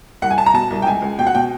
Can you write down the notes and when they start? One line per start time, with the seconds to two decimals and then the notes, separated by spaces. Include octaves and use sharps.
0.22 C2 F#5
0.30 G#5
0.37 C2 A5
0.46 A#5
0.54 B2 A5
0.70 C2
0.82 G5
0.86 C#2 G#5
1.02 C#2
1.19 B2 G5
1.27 F#5
1.35 B2 G5